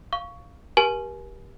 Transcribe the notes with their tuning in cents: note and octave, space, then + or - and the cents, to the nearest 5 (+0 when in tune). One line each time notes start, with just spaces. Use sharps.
F5 +0 C#6 +15
G4 +0 A#4 +40 G#5 +25